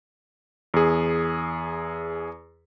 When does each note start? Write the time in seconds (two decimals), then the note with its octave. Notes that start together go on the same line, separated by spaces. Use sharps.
0.74 E2 G#4